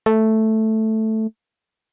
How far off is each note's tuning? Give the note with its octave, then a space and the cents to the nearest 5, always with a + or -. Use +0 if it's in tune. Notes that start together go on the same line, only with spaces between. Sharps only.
A3 +0